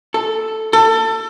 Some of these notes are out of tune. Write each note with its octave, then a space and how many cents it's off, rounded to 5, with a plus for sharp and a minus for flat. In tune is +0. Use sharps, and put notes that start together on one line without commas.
A4 +0
A4 +25